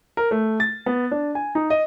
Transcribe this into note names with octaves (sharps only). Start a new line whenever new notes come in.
A#4
A3
A6
B3
D4
G#5
D#4
D#5